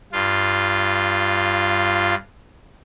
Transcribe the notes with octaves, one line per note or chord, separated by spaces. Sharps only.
G2 F4